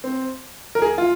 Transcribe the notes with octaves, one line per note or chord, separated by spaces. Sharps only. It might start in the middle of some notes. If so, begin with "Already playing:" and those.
C4
A#4
G#4
F4